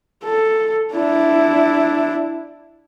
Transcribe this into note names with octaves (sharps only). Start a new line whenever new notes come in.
A4
D4 E4